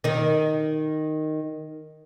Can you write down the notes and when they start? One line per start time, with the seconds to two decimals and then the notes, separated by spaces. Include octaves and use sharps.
0.04 D#3 D#4